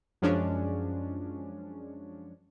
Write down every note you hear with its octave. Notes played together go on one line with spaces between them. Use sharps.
F#2 F3 G#3 C#4 D4